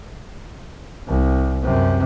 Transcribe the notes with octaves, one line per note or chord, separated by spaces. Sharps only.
C2
F#2 C3